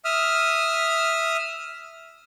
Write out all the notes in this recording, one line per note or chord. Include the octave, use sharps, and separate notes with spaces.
E5 D#6 F6